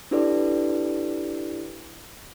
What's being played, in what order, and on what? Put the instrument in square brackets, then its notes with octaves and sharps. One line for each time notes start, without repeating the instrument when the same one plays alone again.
[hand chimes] D4 E4 G4 A4 B4 D5